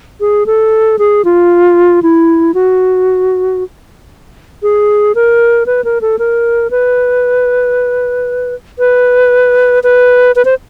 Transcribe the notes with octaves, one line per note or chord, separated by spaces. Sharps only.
G#4
A4
G#4
F4
E4
F#4
G#4
A#4
B4
A#4
A4
A#4
B4
B4
B4
B4
C5